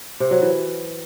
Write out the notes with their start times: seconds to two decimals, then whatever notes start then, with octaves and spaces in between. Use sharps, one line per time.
0.20 C3
0.31 F#3
0.42 E3